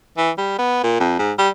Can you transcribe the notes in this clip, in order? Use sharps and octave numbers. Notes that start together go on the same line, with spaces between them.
E3
G3
B3
A#2
F2
G#2
G3